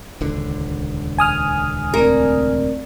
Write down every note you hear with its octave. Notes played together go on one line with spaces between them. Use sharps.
D#1 C#2 D3
G#5 D#6 F6
A3 C4 A#4 D5